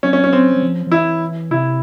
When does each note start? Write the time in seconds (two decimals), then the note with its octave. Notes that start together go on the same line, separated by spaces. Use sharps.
0.03 F#3 C#4
0.13 C#4
0.24 C#4
0.33 C4
0.56 F#3
0.62 F3
0.87 F3
0.92 E3 E4
1.51 C3 E4